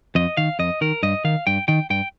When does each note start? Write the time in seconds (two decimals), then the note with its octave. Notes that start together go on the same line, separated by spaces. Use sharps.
0.15 F2 D#5
0.37 D#3 F5
0.59 F2 D#5
0.81 D#3 A#4
1.03 G2 D#5
1.24 D#3 F5
1.47 G2 G5
1.68 D#3 G5
1.90 G2 G5